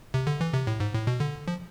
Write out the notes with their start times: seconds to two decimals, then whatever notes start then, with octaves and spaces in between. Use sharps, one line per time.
0.14 C3
0.27 D3
0.41 E3
0.53 C3
0.67 A2
0.80 G#2
0.95 A2
1.07 B2
1.20 D3
1.48 F3